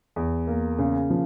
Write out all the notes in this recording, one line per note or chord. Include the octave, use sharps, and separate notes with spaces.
E2
A#3
C#3
F3